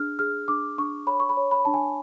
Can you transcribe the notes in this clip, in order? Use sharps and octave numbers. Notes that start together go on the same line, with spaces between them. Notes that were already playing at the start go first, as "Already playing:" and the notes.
Already playing: D4 G#4 F6
G#4 F6
D4 D6
D4 C#6
C#5 B5
C#6
B5
C#5
B5
D4 A5
G#5